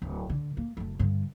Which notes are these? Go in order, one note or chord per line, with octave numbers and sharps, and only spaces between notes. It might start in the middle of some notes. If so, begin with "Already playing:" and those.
D1
D3
A#3
F#1 A3
G2 D3